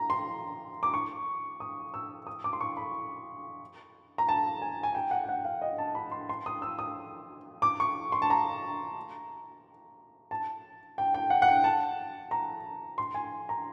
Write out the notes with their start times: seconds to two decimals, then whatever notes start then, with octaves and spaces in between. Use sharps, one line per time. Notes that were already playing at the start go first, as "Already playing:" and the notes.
Already playing: A#5
0.10 C6
0.83 D6
0.94 C#6
1.60 D#6
1.94 E6
2.27 D#6
2.44 D6
2.53 C6
2.61 C#6
2.77 B5
4.18 A#5
4.29 A5
4.62 G#5
4.83 G#5
4.95 G5
5.11 F#5
5.24 G5
5.29 F#5
5.45 F5
5.62 D#5
5.78 A5
5.95 B5
6.12 C6
6.29 C6
6.46 D#6
6.62 E6
6.79 D#6
7.62 D6
7.80 C#6
8.12 C6
8.22 A5
8.30 A#5
10.31 A5
10.98 G5
11.14 G5
11.30 F#5
11.42 F#5
11.48 G5
11.64 A5
12.31 A#5
12.98 C6
13.14 G#5
13.49 A#5